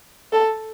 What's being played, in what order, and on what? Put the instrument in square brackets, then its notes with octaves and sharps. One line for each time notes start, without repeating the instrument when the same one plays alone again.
[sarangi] A4